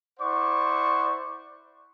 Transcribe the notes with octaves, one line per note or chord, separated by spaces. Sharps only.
E4 C5 D5 F#5 C#6